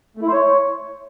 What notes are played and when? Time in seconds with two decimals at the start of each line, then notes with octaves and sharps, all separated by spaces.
0.17 A3
0.22 E4
0.28 C5
0.33 C#5